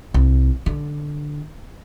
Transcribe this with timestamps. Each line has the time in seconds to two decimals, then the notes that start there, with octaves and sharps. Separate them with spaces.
0.14 C2
0.66 D3